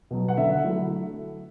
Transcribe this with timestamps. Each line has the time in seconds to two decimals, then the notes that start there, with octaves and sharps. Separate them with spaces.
0.11 B2 F#3
0.28 F#5
0.37 D3 E5
0.64 F#3 A3 E4